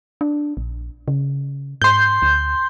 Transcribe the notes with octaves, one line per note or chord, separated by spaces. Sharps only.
D4
A#1
C#3
G#2 C6 G6
D2